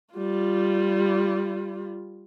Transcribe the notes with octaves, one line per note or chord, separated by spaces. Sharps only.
G3 F4